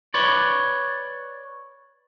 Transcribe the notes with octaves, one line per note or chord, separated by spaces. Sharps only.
B4 C#5 D5